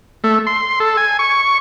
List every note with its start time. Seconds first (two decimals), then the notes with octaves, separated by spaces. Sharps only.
0.24 A3
0.47 C6
0.80 A4
0.97 G#5
1.19 C#6